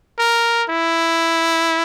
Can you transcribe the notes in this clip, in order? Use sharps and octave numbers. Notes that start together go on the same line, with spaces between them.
A#4
E4